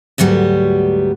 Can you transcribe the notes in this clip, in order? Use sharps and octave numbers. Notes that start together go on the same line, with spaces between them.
D2 G#2 F#3 G3 B3